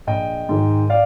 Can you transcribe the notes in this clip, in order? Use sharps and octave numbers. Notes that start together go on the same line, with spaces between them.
A#1 D#5 G5
G#2 D#3
D5 F5